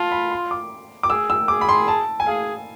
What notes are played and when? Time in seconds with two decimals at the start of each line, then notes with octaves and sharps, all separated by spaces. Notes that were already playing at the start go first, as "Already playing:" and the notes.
Already playing: F4 A5
0.12 B5
0.31 C6
0.51 D6
1.03 D6
1.10 G#4 E6
1.30 E6
1.48 G#4 D6
1.61 B5
1.69 C6
1.88 A5
2.20 G#5
2.26 G#4 F5